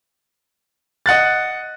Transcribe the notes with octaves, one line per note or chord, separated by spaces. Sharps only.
D#5 F#5 F#6 A6